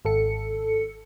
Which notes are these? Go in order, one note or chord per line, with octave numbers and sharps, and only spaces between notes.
G#1 A4 C#7